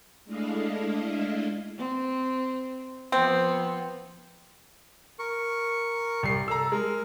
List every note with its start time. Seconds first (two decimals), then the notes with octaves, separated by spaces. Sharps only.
0.25 G#3 A3 D4 E4 D#5 F5
1.78 C4
3.12 F3 B3 C4
5.19 A#4 C#6
6.23 C2 C7
6.48 A4 A#5 E6
6.72 G#3 A#4